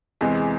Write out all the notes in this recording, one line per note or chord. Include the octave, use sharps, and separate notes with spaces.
E2 C3 E3 G#3